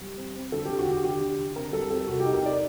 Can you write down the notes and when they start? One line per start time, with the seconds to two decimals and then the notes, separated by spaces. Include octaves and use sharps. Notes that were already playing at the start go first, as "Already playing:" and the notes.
0.01 G3
0.17 C4
0.36 C4
0.52 D3 A4
0.65 D3 G4
0.79 F#4
0.87 D3 G4
1.04 D3 G4
1.21 D3
1.39 D3
1.56 C4 A#4
1.73 G3 A4
1.90 C4 A4
2.07 C3 F#4
2.20 G4
2.25 D#4
2.34 A#4
2.42 D#4 D5